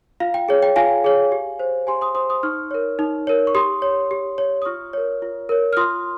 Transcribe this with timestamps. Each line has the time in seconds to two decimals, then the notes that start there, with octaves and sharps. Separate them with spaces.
0.20 F4 F5
0.34 G5
0.49 G#4 C#5
0.62 G5
0.76 F4 F5 G#5
1.04 G#4 C#5
1.32 G4
1.59 C5
1.87 G4 G#5 C6
2.01 C6 D#6
2.15 C5 C6 D#6
2.29 C6 D#6
2.43 D#4 C#6 F6
2.71 A#4 C#5
2.99 D#4
3.27 A#4 C#5
3.47 C#6
3.55 G4 C6 D#6
3.82 C#5
4.11 G4
4.38 C#5
4.62 D#6
4.65 F4 C#6 F6
4.93 A#4 C#5
5.22 F4
5.49 A#4 C#5
5.73 F6
5.77 F4 C6 D#6